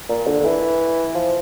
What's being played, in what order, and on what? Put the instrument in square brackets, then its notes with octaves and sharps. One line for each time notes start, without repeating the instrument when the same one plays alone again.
[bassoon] A#2
D3
E3
F3